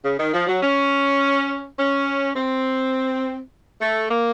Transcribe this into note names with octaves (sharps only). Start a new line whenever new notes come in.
C#3
D#3
F3
F#3
C#4
C#4
C4
A3
A#3